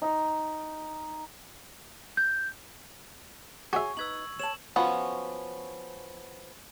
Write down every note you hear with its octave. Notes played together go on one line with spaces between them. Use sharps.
D#4
G6
F#4 G#4 C#5 E5 G#5 C#6
D#4 B4 E6 G#6 F#7
C#5 A5 E7 F#7
F3 B3 C#4 F#4